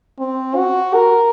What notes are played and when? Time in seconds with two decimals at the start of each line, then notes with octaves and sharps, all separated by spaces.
0.19 C4
0.56 F#4
0.94 A#4